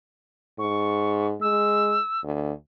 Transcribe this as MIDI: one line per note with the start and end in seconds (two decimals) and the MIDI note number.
0.59 1.35 44
0.59 1.27 85
1.41 1.98 56
1.41 2.21 88
2.24 2.52 38